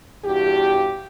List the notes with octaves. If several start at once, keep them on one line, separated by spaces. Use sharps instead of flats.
E2 G2 F#4 G4